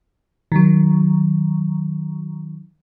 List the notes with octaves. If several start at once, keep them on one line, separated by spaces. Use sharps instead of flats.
D#3 F#3